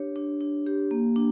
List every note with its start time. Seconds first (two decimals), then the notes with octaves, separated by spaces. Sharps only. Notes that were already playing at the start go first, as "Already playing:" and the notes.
Already playing: D4 G4 C#5
0.16 D4
0.41 D4
0.66 G4
0.91 A#3
1.16 D4